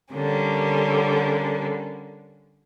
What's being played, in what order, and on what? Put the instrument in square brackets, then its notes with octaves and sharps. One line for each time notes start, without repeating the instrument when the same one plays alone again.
[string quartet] D3 G3 A#3 C#4